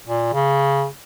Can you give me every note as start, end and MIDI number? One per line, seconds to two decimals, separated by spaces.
0.07 0.30 46
0.33 0.86 49